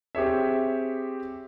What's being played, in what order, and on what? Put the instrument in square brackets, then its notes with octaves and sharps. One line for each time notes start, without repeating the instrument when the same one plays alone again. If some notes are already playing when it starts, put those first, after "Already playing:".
[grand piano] C4 G4 G#4 C#5 E5